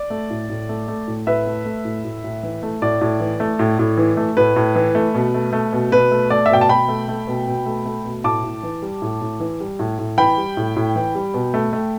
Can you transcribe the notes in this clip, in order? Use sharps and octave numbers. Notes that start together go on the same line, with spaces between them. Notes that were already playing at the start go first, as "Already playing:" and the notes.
Already playing: D5
A3
A2
A2
A3
A3
A2
A2 B4 E5
A3
A3
A2
A2
A2
E3
A3
A2 D5
A2
E3
A3
A2
A2
E3
A3
A2 B4
A2
E3
A3
B2
A3
A3
B2
B2 B4
A3
A3 D5
E5
B2 G5
A5
B2 G5 B5
A3
A3
B2
B2
A3
A3
B2
A2 A5 D6
A2
E3
G3
A2
A2
E3
G3
A2
A2
E3 G5 B5
G3
A2
A2
E3
G3
B2
A3
A3